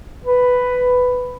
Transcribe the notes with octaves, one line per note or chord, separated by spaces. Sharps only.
B4